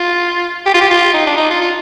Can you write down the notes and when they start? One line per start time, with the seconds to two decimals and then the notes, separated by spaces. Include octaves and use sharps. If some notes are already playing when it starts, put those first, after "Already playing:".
Already playing: F4
0.66 G4
0.74 F4
0.81 G4
0.91 F4
1.14 D#4
1.26 D4
1.37 D#4
1.50 F4
1.61 F4